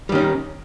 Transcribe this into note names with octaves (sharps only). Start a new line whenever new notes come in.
D#3 G3 C#4 D#4